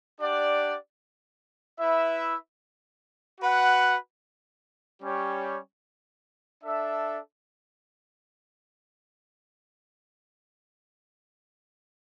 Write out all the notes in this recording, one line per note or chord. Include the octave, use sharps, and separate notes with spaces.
D4 G4 D5 F#5
E4 B4 E5
F#4 B4 F#5
G3 C#4 G4 C#5
D4 A4 E5